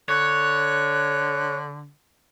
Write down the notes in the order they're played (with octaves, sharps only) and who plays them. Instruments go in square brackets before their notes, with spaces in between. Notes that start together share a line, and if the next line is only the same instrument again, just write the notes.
[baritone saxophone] D3 [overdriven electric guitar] C#5 [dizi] F#6